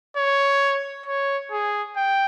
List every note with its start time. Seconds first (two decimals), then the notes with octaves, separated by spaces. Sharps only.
0.17 C#5
1.06 C#5
1.52 G#4
1.97 G5